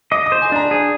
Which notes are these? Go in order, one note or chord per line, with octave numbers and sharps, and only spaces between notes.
D#5 D6
D#6
C5
G#5
D4 A#5
G#4